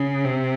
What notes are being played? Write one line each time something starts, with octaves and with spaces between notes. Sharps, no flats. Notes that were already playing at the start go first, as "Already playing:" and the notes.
Already playing: C#3
C3